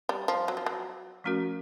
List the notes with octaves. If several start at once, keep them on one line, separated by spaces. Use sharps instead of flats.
G3
F3
F#3
F3
F#3
F3 A3 C#4 F#4 A#4